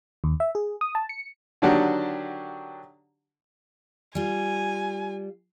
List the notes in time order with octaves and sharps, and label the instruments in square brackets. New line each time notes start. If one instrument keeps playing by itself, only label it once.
[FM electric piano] D#2
E5
G#4
D#6
A5
C#7
[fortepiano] D3 D#3 F#3 D4 F#4 G4
[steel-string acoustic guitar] G3 F4 [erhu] G#5